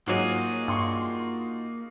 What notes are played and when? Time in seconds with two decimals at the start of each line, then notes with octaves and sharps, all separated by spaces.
0.08 G#2 F#3 A#3 D#4 F4 F#4 G#4
0.68 G2 C6 C#6